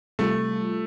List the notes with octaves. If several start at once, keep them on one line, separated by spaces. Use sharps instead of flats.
C3 G3 A3 F4 A4